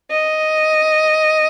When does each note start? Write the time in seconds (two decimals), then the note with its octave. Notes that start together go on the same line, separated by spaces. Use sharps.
0.11 D#5